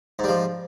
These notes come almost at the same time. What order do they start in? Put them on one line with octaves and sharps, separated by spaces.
G#2 G3 F3